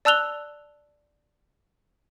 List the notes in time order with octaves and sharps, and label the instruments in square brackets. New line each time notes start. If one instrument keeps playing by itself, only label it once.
[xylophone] D5 A5 E6 F#6 F7 G7